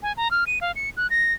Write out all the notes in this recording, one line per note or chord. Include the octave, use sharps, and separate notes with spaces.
G#5
A#5
F6
D#7
F5
C#7
F#6
A#6